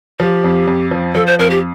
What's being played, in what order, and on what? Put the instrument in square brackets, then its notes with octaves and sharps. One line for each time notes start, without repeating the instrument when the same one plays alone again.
[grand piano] F3 [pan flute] G4
[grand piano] F2
F2
F3
[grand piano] F3 [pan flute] A4
[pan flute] C5
[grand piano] F2 [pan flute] A#4
[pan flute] G4